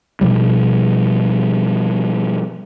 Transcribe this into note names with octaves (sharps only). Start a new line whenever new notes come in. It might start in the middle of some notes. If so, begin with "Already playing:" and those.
B2 F3 G3